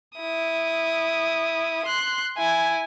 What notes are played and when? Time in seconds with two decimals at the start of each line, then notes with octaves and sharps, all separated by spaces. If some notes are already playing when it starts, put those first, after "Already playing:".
0.19 E4 D#6
1.86 C6 F#6
2.38 E4 G#5